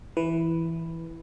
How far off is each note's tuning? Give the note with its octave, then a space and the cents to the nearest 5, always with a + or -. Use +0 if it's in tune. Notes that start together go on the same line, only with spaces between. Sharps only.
E3 +0 B4 +0